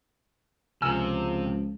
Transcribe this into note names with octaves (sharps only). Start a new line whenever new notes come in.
C#2 C3 F3 A#4 G#5 E6